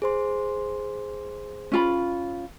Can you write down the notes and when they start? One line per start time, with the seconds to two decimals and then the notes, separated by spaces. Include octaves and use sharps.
0.02 G#4 C5 C6
1.72 C#4 F4 B5